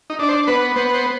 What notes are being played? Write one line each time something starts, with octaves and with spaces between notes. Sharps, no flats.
D#4
D4 D5
C5
B3 B4
B3 C5
C5